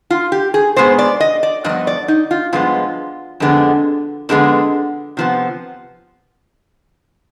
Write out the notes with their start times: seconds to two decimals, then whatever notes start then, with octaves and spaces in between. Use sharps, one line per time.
0.10 F4
0.32 G4
0.54 G#4
0.76 B2 G#3 B3 C5
0.98 D5
1.20 D#5
1.43 D5
1.64 G2 F3 B3 D#5
1.87 D5
2.08 D#4
2.31 F4
2.53 G2 F3 G#3 B3 F4
3.40 F2 D3 G#3 B3
4.29 F2 D3 G#3 B3
5.17 C3 F3 B3